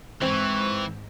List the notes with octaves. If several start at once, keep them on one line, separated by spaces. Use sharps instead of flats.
G#2 E3 C4 C#6